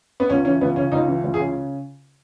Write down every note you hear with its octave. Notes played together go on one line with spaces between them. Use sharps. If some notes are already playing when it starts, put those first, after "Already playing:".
B3
C#2 C#4
E3 C#4
C#2 B3
C#3 C#4
C#2 D#4
E3
C#2
G#4
C#3